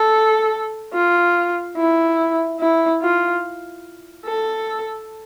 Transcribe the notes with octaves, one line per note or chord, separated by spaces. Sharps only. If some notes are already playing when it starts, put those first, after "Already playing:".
Already playing: A4
F4
E4
E4
F4
A4